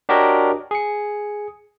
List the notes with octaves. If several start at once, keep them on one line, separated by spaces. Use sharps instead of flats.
D4 F#4 G4 A#4 C#5 D#5
G#4 C#7